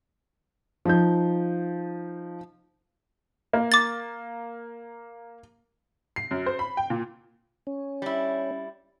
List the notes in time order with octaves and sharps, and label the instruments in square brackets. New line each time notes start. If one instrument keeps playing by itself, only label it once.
[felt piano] F3 D#4 G6
[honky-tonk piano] A#3
[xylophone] D6 A6
[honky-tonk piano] C7
F#2
C5
B5
G5
A#2
[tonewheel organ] C#4
[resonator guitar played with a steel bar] G3 E4